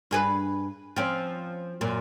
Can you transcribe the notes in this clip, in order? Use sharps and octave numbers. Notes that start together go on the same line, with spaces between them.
G2 G#4 B4
F3 C4 C#4
F#2 A#2